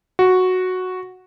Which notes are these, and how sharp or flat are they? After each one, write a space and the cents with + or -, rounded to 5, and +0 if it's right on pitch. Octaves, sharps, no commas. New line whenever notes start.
F#4 -5